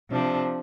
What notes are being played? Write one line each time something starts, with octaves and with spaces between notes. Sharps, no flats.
C3 F3 D4